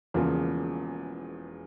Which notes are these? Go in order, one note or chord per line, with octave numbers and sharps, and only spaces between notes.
E1 E2 C#3 F3 A#3